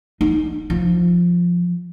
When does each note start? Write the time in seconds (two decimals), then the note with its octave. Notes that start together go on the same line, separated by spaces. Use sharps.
0.21 D#4
0.70 F3